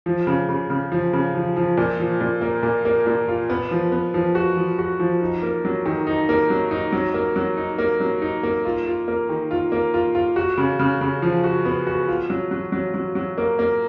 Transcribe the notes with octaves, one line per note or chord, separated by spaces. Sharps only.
F3
C#3
C#3
C#3
F3
C#3
F3
F3
A#2
F3
A#2
A#3
A#2
A#3
A#2
F4
B3
F3
B3
F3
F#4
F3
F#4
F3
D#4
A#3
F#3
D#3
D#4
A#3
F#3
D#4
F#3
A#3
F#3
D#4
A#3
F#3
D#4
A#3
F4
F4
A#3
D#3
F4
A#3
F4
F4
F#4
C#3
C#3
C#3
F3
F#4
B3
F#4
F4
F#3
F#3
F#3
F#3
F#3
A#3
A#3